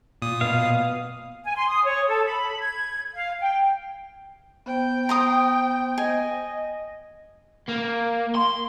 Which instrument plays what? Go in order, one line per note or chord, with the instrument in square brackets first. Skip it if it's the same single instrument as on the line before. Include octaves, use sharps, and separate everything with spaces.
[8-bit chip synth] A#2 D#6
[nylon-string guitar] B2 [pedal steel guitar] F5
[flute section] G#5
C6
D#6
C#5
A4
B5
G#6
F5
G5
[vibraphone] B3 C5 [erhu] G5
[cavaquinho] A#5 C6 D#6
[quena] D#5 [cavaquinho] G#5
[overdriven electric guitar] A#3
C6